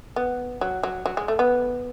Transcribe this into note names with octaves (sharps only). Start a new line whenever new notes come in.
B3
F#3
F#3
F#3
G#3
A3
B3